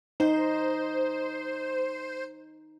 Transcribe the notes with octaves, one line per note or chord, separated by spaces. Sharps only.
D#4 C5